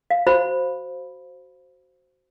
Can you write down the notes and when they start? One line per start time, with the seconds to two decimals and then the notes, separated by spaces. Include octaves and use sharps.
0.10 F5
0.27 F#4 C5 B5